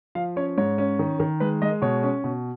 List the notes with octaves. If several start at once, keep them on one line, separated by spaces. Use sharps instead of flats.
F3 F5
C#4 C#5
G#2 C#5
C#4
D#3
D#3
G#3 B4
G#3 D#5
B2 C#5
C#4
B2